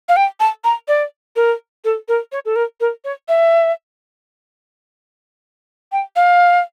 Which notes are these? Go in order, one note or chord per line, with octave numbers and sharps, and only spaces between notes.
F5
G5
A5
A#5
D5
A#4
A4
A#4
C#5
A4
A#4
A#4
C#5
E5
G5
F5